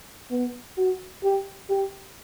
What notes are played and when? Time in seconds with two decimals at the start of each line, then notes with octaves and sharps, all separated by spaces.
0.31 B3
0.77 F#4
1.23 G4
1.69 G4